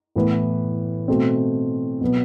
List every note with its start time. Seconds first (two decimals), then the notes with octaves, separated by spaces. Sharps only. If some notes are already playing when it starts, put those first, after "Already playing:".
0.16 A2 E3 B3 E4 B4
1.08 B2 A3 C4
2.01 B2 F#3 B3